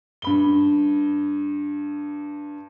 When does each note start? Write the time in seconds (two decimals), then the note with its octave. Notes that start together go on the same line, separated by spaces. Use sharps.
0.22 G2 B5 G7